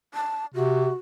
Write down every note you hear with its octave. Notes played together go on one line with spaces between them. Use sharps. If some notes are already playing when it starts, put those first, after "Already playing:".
A5
C3 F#4